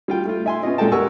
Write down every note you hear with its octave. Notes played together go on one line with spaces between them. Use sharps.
G3 F4 G5
A3 F4
E5 G#5 C6
B3 C#4 F4 D#5
A#2 G#3 F4 A4 G5 A5
G4 A#4 F#5 G#5 C#6 E6